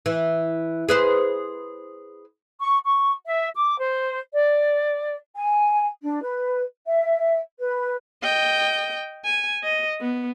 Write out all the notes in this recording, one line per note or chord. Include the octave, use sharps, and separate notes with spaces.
E3
G#4 B4 C5
C#6
C#6
E5
D6
C5
D5
G#5
D4
B4
E5
B4
D#5 G5
G#5
D#5
B3